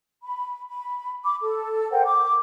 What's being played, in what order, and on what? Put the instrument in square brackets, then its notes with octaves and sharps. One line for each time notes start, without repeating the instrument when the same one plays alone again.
[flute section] B5
B5
B5 D6
A4
A#4 C5 F#5 G5
D6